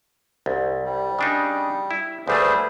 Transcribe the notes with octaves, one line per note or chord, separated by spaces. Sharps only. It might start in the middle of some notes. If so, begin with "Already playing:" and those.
C2
G3
C#3 D4 D#4
E4
D2 G3 A3 G#4 B4 C5